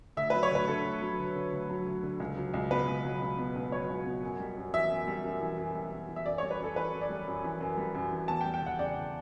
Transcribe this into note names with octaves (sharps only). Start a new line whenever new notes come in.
D2 E5
F#3 B4
C#5
D2 B4
D3 A4
D2
F#3
D2
D3
D2
F#3
D2
D3
C#2
F#3
C#2
B2 B4
C#2
F#3
C#2
B2
C#2
F#3 C#5
C#2
B2
F#2
G3
F#2
E3 E5
F#2
G3
F#2
E3
F#2
G3
F#2
E3
E5
F#2 D5
G3 C#5
B4
F#2 A4
E3 B4
F#2
D5
G3
F#2
E3
F#2
G3
F#2
E3
E2 A5
G5
G3
G5
E2 F#5
C#3 D5
E2